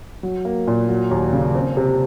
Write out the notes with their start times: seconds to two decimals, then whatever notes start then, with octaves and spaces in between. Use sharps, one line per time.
0.23 F#3
0.45 A#3
0.67 A#2
0.89 F#3
1.11 D#2
1.33 C#3
1.55 C4
1.77 C3